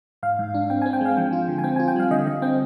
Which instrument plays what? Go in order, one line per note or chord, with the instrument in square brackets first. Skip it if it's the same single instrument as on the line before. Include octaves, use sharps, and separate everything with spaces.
[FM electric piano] G#2 F5
G#2
D4
C4 G5
G#5
C4
G5
G#3 F5
F3 G5
F4
D3
G#5
C4 G5
G#5
F4
G5
G3 F5
D3 D#5
D3 D#5
C4 G5